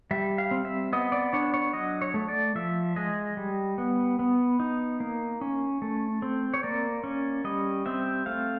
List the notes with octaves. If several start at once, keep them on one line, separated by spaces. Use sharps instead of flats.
G3 E5
F5
C4
E5
B3 D#5
D5
D4 C#5
C#5
F#3 D#5
C#5
A3
D5
F3 E5
G#3 D#5
G3
B3
B3
D#4
A#3
C#4
A3
C4
C#5
A#3 D5
C#4
G3 D#5
C4 E5
A3 F5